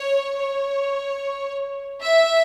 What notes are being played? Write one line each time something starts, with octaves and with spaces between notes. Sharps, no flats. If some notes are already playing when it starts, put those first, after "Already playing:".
Already playing: C#5
C#5
E5